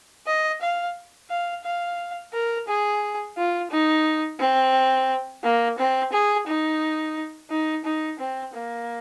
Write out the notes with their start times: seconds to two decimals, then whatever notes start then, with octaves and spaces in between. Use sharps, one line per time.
0.27 D#5
0.61 F5
1.30 F5
1.65 F5
2.33 A#4
2.68 G#4
3.37 F4
3.71 D#4
4.40 C4
5.44 A#3
5.78 C4
6.12 G#4
6.47 D#4
7.50 D#4
7.84 D#4
8.19 C4
8.54 A#3